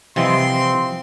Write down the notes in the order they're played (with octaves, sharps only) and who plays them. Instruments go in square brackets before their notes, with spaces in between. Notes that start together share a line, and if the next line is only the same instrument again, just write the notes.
[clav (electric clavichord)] C3 E3 [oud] F3 D#5 [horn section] C4 C6